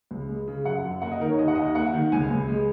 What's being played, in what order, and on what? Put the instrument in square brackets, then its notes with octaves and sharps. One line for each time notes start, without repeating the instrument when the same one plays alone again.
[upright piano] C#2
G#3
C#3
F#2 F#5
F#2
A#3 F#5
D#5
D#3 A#4
C#5
D#2 D#5
F#5
D#2 D#5
A#3 F#5
D#3
C#2 G#5
C#2
G#3